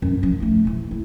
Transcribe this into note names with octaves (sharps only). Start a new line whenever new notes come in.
F#2 D4
F1 F3
A3 D#4
A#1 E2
E4